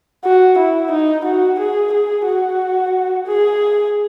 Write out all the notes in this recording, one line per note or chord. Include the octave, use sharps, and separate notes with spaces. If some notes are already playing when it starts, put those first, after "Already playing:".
F#4
E4
D#4
F#4
G#4
G#4
F#4
G#4